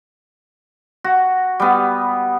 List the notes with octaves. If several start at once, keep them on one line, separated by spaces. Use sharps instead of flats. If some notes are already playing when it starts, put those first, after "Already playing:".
F#4
G3 B3